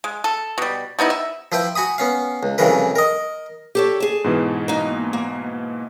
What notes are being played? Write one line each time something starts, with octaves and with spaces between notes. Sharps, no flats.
G#3
A4
B2 G3
G3 B3 D#4 E4
E5
F3 E4 B4 G5
F#4 G#5 B5 D#6
B3 C#4 F5
C#2
C2 F2 C#3 E3 A#4 B4
A#4 D#5
G4 A4 C#5
G#4 A5
G#2 B2 E3
A#3 D#4
A#3